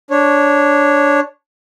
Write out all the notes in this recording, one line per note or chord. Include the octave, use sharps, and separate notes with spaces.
D4 C#5